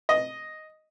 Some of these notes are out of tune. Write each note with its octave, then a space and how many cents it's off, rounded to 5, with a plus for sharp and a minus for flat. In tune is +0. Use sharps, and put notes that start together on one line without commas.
D#5 +0